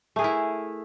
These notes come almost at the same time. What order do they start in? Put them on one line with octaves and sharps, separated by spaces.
A3 G#4 A#4 E4